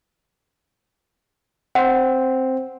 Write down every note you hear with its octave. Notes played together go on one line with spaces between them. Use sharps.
C4 C5 F#5